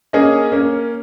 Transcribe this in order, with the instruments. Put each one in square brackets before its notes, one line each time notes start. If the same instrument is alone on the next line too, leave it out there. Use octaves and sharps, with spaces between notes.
[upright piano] A#3 C#4 G#4 D#5
A#3 C#4